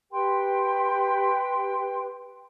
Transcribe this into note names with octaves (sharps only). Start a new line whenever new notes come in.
G4 B4 G5 C6